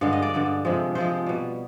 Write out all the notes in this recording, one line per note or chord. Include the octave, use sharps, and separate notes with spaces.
G2 D3 G#3 F5
D#5
D5
G2 D3 G#3
C3 F3 G#3
C3 F3 G#3 C5
B2 G3